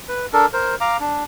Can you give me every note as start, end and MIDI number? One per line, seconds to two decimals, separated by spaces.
0.09 0.26 71
0.33 0.46 62
0.33 0.46 69
0.33 0.46 70
0.53 0.75 70
0.53 0.75 72
0.81 0.97 77
0.81 0.97 82
0.81 0.97 86
1.00 1.24 62